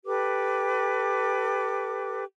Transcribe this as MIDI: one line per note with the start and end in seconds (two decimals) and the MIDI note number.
0.05 2.24 67
0.05 2.24 69
0.05 2.24 71
0.05 2.24 86